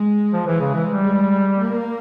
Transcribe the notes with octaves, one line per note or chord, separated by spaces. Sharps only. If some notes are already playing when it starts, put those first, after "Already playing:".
Already playing: G#3
F3
E3 G#3
C#3
E3
G3
G#3
A#3